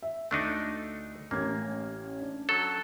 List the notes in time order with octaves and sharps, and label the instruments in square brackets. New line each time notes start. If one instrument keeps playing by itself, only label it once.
[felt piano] E5
[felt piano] D2 C#7 [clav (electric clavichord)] A3 D4 D#4
[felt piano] A1 C#4 G#6 [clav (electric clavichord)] A#3
[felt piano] D4
[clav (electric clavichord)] F#3 A4